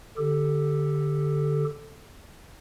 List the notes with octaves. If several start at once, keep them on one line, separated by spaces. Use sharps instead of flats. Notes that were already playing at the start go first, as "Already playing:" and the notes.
D3 G4 A4